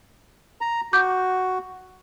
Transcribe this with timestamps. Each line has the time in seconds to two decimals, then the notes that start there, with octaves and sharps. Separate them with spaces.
0.61 A#5
0.93 F#4 D6 G6